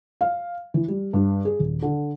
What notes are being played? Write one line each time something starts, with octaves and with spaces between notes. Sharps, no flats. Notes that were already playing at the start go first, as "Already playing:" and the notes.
F5
E3
G3
G2
G#4
D#1
D3